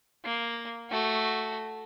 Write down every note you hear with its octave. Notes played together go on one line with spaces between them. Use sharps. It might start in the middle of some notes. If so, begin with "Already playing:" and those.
A#3
A3 F#4